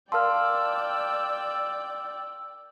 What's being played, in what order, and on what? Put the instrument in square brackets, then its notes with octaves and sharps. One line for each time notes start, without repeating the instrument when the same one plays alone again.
[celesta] A#4 F5 A5 [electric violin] D5 G5 [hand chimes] C6 F6 [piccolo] E6